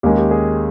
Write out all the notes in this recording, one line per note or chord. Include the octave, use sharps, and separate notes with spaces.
D#2 D#3 G#3 C#4 G4
G4
G#4